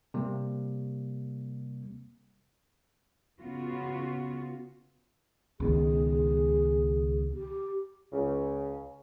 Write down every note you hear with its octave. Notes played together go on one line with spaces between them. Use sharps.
C3 G3 A#3
C#3 B3 F4 F#4
C#2 B2 D#3 G#4
G4
C#2 C#3